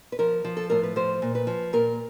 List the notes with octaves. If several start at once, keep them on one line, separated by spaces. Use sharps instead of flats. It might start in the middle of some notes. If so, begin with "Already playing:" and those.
B4
F3 A#4
F3
A4
A2 A#4
B4
F3 C5
A#2
B4
F3
A#2 A#4